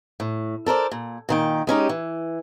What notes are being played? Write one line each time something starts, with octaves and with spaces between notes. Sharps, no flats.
A2
A4 A#4 C5 D5
A#2
A#2 D#3 G5
G#3 C#4 D#4 G4
E3